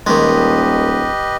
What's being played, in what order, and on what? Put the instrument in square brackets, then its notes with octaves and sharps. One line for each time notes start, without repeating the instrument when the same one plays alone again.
[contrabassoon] D#1 [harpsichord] D#3 G#3 [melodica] G4 B4 D#5